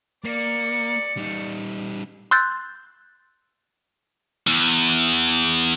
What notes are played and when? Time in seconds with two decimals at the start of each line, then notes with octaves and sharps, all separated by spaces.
0.24 A#3 D5 C#7
1.17 G3 D#4
2.31 C6 E6 F#6 G6 A6
4.47 E2